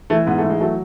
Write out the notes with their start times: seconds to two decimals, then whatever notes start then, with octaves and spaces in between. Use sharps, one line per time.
0.10 E3 A3
0.27 G#2 B3
0.38 A3
0.44 E3
0.50 G#3
0.61 F#3 A3